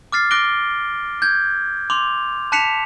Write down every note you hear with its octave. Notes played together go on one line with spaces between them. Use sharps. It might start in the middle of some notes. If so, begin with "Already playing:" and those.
D6 F6 A6 C7
D6 F#6 A#6 D7 G7
G6 G#6
C6 D6 F7
A5 F#6 B6 C#7 E7 F7